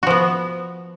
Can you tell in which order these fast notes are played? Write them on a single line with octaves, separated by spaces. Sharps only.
F#4 F3 B3